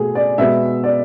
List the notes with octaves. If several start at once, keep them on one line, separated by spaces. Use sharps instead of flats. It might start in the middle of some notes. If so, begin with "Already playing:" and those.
Already playing: B2 A3 G#4
D5
B2 G#3 B3 E5
D5